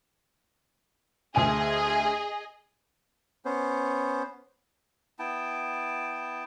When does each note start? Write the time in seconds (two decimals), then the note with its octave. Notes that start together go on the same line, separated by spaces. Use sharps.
1.35 D2 G#4 D#5 G#5 D#7
3.45 B3 C#4 C5
5.19 B3 E4 G5 A5